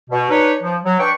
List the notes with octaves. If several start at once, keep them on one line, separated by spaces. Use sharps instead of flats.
B2
D4 D#4 B4 C#5
F3
F#3
D4 B4 G5 C#6